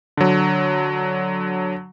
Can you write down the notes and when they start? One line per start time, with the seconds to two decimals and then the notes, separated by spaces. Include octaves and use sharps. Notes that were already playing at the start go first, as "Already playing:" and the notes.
0.17 D3 F#3